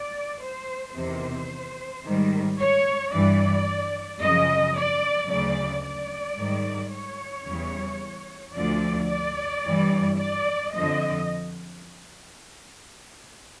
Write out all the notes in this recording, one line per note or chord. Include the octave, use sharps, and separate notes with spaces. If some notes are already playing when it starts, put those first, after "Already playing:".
Already playing: D5
C5
E2 C3 D#3 C5
G#2 D#3 G3
C#5
G2 E3 G3 D5
F#2 C#3 F3 D#5
D5
D2 C#3 F#3 D5
D5
G#2 D#3 G3
C#5
E2 C#3 E3 G3
D2 D3 F3 D5
D5
G2 E3 G3
D5
F2 D3 F3 D#5